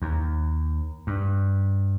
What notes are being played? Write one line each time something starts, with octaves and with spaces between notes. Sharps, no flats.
D#2
G2